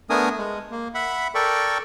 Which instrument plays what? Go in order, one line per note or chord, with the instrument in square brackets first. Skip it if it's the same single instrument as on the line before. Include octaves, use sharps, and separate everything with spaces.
[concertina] A3 B3 D4 A#4 G#5 D#6
G#3
A#3
E5 F#5 B5
A4 A#4 D5 G5 C#6